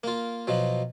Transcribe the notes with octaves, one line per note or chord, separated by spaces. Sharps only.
A#3 F4
B2 F3 F#3